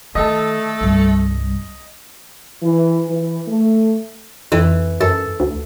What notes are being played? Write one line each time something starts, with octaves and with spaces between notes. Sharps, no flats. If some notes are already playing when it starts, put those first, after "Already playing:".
D#3 A3 A4 D#5 A5
C2 G2
E3
E3
A3
F2 E3
F#2 A4
D2